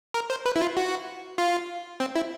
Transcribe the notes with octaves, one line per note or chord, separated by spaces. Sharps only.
A#4
C5
B4
E4
F4
F#4
F4
C4
E4